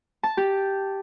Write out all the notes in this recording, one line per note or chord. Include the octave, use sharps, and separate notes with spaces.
A5
G4